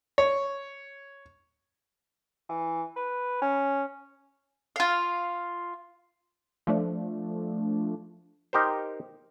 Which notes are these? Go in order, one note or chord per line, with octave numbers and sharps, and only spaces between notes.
C#5
E3
B4
C#4
F4 F5
F3 A3 D4
D#4 G4 A#4 C5